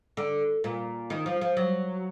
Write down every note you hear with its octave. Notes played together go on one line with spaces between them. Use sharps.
D3
A#2
D#3
F3
F3
F#3